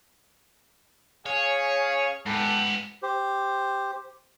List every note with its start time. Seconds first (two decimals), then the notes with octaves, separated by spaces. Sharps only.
1.26 C#4 G#4 C#5 F5
2.26 G#2 B3 G4 A4 B4
3.03 G4 C5